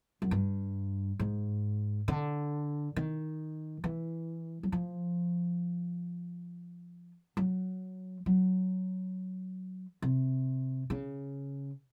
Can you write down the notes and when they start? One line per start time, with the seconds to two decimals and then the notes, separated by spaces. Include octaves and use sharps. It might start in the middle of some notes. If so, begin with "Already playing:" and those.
0.22 F#2
0.31 G2
1.19 G#2
2.08 D3
2.96 D#3
3.84 E3
4.63 F#3
4.72 F3
7.37 F#3
8.26 F#3
10.02 C3
10.90 C#3